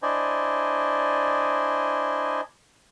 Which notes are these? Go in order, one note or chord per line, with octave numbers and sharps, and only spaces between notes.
D4 E4 C5 D5 D#5 G#5